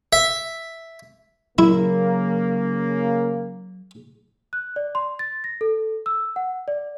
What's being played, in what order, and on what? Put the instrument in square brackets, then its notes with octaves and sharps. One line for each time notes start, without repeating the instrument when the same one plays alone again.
[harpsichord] E5
[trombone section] C#3 A#3 [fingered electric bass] F#3 [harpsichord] E4
[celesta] F#6
D5
C6
A6
A#6
A4
E6
F#5
D5